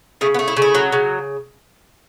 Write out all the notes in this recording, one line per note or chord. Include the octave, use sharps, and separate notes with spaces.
C#3 A3
B3
A3
E4
C#3
E4
F#3
C#3